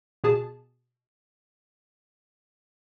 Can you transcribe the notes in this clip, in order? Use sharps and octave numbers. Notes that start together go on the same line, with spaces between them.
B2 G#4 A5